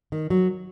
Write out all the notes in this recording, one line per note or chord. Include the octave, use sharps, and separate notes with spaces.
D#3
F#3